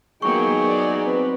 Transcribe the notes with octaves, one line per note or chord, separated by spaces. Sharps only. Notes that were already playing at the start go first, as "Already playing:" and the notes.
F#3 A#3 B3 D#4 G#4 G5 C#6
D5
C4 B4